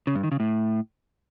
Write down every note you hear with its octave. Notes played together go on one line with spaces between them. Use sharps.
C#3
G2
D#3
C#3
A2